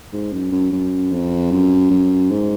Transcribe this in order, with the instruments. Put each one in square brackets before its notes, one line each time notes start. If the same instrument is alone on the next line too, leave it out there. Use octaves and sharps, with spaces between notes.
[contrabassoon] G#2
F#2
F#2
F#2
F2
F#2
F#2
G#2